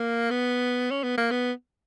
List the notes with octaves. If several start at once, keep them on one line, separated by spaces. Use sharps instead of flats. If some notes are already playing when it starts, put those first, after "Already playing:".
Already playing: A#3
B3
C#4
B3
A#3
B3